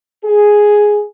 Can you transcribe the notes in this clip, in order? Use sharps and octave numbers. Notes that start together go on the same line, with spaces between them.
G#4